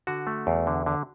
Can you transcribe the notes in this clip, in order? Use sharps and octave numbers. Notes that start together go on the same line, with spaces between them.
D3 F#4
A3
E2
D3
D3